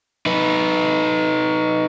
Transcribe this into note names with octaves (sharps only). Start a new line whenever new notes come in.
D#4 B4